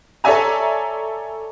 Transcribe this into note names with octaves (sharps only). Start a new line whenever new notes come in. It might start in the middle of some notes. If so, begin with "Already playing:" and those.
A4 C#5 D5 E5 G#5 A#5